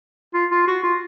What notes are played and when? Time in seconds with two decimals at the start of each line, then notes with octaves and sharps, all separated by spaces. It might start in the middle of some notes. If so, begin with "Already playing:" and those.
0.34 F4
0.51 F4
0.67 F#4
0.83 F4